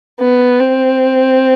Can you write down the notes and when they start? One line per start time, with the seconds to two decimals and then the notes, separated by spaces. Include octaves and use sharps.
0.20 B3
0.60 C4